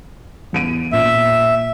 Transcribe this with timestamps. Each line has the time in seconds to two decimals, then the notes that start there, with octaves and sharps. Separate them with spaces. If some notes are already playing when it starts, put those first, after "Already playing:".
0.53 E2 D7 D#7
0.92 A#2 E5